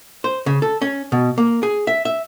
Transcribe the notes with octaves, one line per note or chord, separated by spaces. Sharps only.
C5
C#3
A4
C#4
B2
A#3
G#4
E5
E5